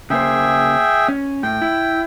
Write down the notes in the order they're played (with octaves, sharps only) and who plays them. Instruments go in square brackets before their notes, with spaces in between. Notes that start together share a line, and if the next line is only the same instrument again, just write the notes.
[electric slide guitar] C#3 A#3 C5 [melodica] G#4 E5 G5
[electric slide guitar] C#4
[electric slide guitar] A2 [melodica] G5
[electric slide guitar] E4